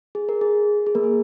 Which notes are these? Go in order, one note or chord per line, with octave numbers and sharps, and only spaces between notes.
G#4
A#4
G#4
G#4
A#3 A#4
G#4